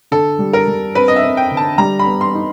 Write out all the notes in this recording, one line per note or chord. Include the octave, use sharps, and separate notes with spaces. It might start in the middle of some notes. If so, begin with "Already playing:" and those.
D3 A4
G3
A#4
G3
C4 B4
D#5
E5
C4
G5
D3
A5
G3 A#5
B5
B3
C6
D#4